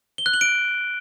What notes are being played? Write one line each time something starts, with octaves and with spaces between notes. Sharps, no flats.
G7
F#6
F#7
D7